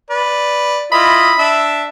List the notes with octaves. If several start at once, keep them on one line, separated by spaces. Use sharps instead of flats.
B4 D5
E4 F4 D#5 B5
D4 E5